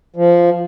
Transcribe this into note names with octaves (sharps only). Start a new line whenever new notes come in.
F3